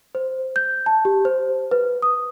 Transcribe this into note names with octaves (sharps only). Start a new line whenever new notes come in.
C5
G6
A5
G4
C5
B4
D#6